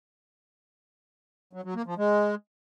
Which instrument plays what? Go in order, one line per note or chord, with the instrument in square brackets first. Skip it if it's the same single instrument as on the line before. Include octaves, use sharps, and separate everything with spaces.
[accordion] F#3
F#3
A#3
F3
G#3